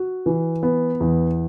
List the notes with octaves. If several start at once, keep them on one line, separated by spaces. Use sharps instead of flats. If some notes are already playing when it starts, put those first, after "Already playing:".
Already playing: F#4
E3
B3
E2